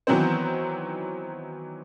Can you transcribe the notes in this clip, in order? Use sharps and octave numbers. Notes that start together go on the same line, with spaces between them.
D#3 E3 F#3 B3 C4 C5